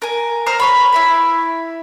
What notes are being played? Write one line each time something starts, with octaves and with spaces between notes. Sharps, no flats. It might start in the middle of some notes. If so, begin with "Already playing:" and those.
A#4 G#5
C5 A#5 F6
B4 C#5 B5
E4 E5 B5